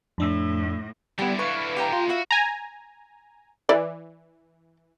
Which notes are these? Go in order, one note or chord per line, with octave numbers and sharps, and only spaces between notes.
F2 A2 D4 E6
D3 G3 B3 E4 G4
B4 F5 C#6
G4 G5 A#5
A3 F4 C6
E4 F#4 E5 F5
G#5 A#5
E3 D5